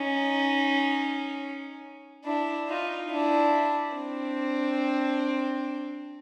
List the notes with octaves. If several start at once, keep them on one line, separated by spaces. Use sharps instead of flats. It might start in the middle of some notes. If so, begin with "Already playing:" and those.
Already playing: C#4 D#4
D4 E4
D#4 F4
D4 E4
C4 D4